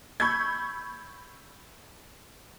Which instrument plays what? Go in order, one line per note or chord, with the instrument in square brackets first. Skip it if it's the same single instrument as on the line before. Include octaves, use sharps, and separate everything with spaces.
[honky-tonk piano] B5 C#6 E6 G6 G#6